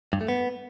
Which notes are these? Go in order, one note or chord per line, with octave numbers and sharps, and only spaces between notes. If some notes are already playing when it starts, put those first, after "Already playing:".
G2
A3
B3